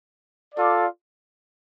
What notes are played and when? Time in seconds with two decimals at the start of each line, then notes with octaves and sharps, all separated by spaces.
0.54 F4 A4 D5